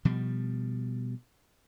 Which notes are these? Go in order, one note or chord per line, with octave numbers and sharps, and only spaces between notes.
B2 F3 G3